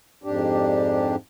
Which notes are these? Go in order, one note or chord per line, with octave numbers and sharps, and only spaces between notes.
F2 G#2 D4 G4